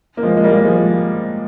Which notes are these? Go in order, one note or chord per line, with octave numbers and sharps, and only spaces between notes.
A#3
F3 G#3
G#3
G3 A#3
F3 G#3